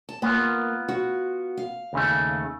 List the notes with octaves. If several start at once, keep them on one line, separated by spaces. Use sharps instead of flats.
A5
A#3 B3 F4
F#4
F5
D#2 C#3 A3